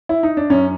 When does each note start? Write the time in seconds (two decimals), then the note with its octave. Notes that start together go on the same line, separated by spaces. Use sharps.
0.09 E4
0.23 D#4
0.37 D4
0.50 F#2 C#4